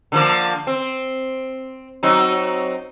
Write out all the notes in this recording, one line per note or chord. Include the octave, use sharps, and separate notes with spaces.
D3 F3 A#3
C4
F#3 C4 D#4